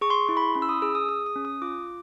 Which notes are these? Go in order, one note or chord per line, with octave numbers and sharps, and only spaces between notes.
G#4 C#6
C6
C#6
E4 C6
B5
C6
C#4 B5
E6
D#6
G#4 E6
D#6
G#4 D#6
D#6
C#4
D#6
F4 D6